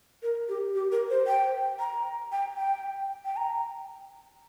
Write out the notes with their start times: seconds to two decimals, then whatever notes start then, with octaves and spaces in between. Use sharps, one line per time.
0.23 A#4
0.49 G4
0.75 G4
0.92 A#4
1.10 C5
1.27 G5
1.80 A#5
2.32 G5
2.58 G5
3.25 G5
3.37 A#5